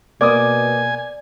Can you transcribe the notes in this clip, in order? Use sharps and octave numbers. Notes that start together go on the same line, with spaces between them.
B2 A#3 D5 G#5 D6 D#6